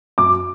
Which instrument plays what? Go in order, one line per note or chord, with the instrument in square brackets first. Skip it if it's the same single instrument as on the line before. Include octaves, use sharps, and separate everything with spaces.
[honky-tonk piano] F#2 D6